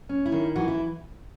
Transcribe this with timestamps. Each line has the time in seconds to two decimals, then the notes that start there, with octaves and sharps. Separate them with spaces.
0.09 C#4
0.26 E4
0.32 D#3
0.56 E3 F#4
0.68 E4